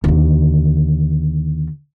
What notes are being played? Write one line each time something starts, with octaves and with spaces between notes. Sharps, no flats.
D#2 D3